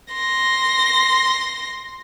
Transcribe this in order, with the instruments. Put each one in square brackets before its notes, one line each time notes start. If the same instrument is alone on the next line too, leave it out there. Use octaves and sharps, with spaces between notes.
[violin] C6 A#6